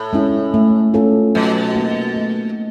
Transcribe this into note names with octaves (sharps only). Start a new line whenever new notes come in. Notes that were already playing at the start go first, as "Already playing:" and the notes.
Already playing: A2
G#3 C#4 E4
A3
C#4 F4 A4
B2 F#3
A#3 D#4
A3